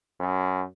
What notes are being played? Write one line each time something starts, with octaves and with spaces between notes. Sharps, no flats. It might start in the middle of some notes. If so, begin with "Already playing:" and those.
F#2